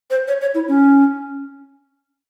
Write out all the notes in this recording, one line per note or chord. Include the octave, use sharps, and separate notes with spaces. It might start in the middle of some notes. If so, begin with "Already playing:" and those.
C5
C#5
C#5
E4
C#4